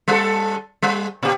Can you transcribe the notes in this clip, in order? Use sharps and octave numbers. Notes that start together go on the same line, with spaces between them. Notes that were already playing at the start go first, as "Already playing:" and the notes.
G3 A4
G3
A#2 G4